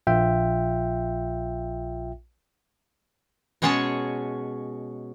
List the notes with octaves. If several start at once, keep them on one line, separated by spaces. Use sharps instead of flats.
A#1 F4 E5 G5
B2 G#3 C#4 G#4 C#5 A5